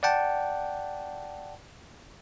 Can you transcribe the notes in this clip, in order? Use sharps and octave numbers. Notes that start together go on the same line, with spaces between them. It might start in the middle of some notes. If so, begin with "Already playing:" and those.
D5 F#5 G5 A5